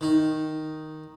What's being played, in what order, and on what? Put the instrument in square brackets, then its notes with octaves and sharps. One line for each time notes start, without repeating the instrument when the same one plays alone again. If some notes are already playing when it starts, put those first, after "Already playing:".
[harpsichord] D#3 D#4